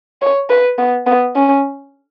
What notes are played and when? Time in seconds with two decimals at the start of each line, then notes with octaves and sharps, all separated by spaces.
0.22 C#5
0.49 B4
0.78 B3
1.07 B3
1.35 C#4